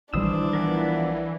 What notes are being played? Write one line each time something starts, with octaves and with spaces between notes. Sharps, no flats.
A#1 D#3 E3 G3 D4 C5 D#6 E6
F3 B3 A#4